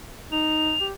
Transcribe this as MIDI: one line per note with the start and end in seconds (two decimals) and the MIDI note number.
0.32 0.74 63
0.32 0.86 101
0.81 0.92 67